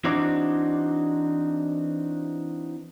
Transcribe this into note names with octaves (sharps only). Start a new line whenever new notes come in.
E3 C4 D4 D#4 F#4 D5